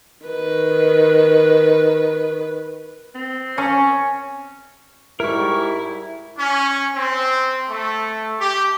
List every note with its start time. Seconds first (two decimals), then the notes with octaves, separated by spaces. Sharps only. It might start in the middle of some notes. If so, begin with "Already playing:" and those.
0.26 D#3 B4
3.15 C4
3.58 C#4 G#5 C#6
5.20 G#2 G3 E4 A#4 C#6
6.39 C#4
6.95 C4
7.69 A3
8.40 G4